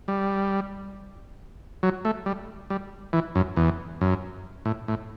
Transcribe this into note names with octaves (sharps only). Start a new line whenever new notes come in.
G3
F#3
A3
G3
G3
E3
F#2
E2
F#2
A2
A2